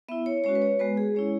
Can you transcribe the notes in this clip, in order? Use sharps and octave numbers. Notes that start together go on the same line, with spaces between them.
B3 E4 E5
C#5
G#3 C#4 F#4 C#5
B4
C#5
G#3 B3 F#4 B4
G#4
G#3 C#4 E4 C#5